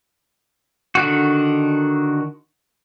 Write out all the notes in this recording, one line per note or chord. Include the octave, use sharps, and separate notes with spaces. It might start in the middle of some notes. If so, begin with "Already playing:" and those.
D3 D#3 F#4